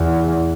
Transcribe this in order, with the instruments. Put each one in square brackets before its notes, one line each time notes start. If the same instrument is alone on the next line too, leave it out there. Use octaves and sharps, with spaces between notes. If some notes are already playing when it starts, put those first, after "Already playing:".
Already playing: [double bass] E2